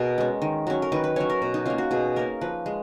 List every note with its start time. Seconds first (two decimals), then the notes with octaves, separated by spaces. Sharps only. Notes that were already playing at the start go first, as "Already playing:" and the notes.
Already playing: B2 G#4 A#4
0.18 G#3 C#4
0.42 D#3
0.67 F#3 C#4
0.82 A#4
0.92 D#3 B4
1.04 B4
1.16 F#3 C#4 C#5
1.30 A#4
1.42 B2
1.54 D#4
1.66 A#3 C#4 F4
1.78 F#4
1.91 B2 G#4
2.16 A#3 C#4 A#4
2.41 F3 B4
2.66 G#3